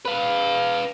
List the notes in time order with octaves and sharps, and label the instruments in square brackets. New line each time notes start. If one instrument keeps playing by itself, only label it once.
[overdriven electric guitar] B4 F5